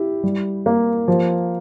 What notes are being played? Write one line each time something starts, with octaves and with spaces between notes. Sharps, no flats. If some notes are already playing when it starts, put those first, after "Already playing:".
Already playing: E4 G4
G3
A#3
F3